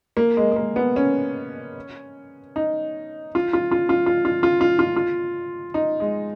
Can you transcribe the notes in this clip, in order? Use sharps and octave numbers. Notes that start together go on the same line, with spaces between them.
A#3
G#3
G#3
A#3
B3
C#4
D#4
F4
F4
F4
F4
F4
F4
F4
F4
F4
F4
D#4
G#3